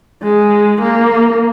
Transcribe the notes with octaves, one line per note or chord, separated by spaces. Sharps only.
G#3
A#3